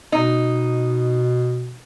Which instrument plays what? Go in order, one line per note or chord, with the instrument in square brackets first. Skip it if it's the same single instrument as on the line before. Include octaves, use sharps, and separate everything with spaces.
[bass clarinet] B2 [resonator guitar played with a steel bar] D#4